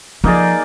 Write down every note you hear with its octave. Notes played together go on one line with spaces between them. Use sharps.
F3 A#3 D#4 G#4 D5